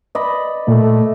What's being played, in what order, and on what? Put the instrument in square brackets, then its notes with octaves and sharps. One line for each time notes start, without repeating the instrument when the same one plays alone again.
[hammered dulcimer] D5 D#5 B5
[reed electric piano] A#2 [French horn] A3